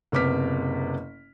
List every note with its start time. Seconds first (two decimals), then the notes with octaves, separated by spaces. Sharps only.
0.12 F#1 C3 B3 D6 F6 B6